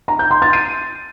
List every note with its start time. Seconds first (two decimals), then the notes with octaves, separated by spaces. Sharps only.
0.08 A#5
0.19 G6
0.31 C6
0.42 A6
0.53 D#7